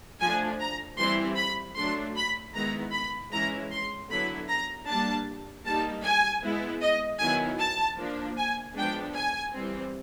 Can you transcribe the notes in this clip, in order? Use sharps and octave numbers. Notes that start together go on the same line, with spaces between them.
F3 A3 D4 G#5
A#5
E3 G3 C4 E4 C6
B5
F#3 A3 D4 C6
B5
D#3 G#3 B3 E4 A#5
B5
E3 G#3 C#4 E4 A#5
C6
D3 F#3 B3 E4 B5
A#5
G3 A#3 D4 A5
G3 A#3 D#4 A5
G#5
G#3 B3 E4
D#5
D#3 F#3 B3 E4 G#5
A5
F3 A#3 D4
G#5
F3 G#3 B3 D4 G5
G#5
E3 G3 C4